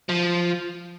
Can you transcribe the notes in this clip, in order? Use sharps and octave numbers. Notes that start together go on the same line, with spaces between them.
F3